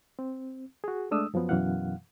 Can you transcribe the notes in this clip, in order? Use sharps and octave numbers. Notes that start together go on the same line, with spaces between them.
C4
F#4 G#4
G#3 A3 D4 D#6 E6
F#2 F3 F#3 B3
F#2 B2 E3 F5 F#5